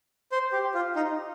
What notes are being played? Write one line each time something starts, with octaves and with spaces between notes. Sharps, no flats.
C5
G4
F4
D#4